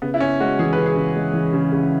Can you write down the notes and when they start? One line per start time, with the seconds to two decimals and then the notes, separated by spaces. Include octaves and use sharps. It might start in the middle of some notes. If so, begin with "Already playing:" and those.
0.02 C#3 B3
0.14 E4
0.20 C#3 C#4
0.40 G#3 F#4
0.59 E3 G#4
0.73 C#3 B4
0.86 G#4
0.96 C#3
1.16 G#3
1.33 E3
1.53 C#3
1.72 C#3